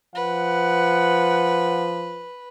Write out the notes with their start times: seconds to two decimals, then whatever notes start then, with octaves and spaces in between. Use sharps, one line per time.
0.15 F3 B4 F#5